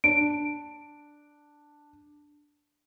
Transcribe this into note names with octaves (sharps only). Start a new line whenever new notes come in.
D4 D7